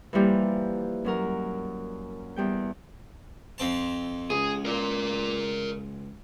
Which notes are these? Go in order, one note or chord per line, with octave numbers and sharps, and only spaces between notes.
E3 F3 G3 A#3
F#2 F#3 A#4
E2 G3 G5
F2 C4 A5
C#2 G#4
A#4 D5